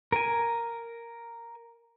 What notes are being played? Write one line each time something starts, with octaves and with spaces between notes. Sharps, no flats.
A#4 G#5